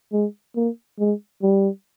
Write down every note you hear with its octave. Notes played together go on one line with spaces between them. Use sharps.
G#3
A#3
G#3
G3